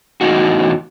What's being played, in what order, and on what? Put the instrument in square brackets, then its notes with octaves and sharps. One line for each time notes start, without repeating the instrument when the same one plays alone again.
[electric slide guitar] E2 A2 D#4 F#4